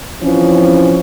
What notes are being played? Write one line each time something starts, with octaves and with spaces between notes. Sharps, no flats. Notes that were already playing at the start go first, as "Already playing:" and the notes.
E3 F3 C4 C#4